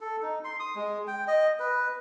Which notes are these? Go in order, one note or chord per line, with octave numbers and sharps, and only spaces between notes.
A4
D#4
C6
D#6
G#3
G5
D#5
B4